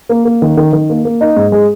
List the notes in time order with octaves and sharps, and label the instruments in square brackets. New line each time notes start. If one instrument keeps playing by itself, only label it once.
[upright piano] A#3
A#3
D#3
D#3
D#3
A#3
A#3
D#4
G#2
G#3